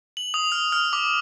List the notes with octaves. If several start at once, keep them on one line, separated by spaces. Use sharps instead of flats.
F#7
D#6
F6
F6
D6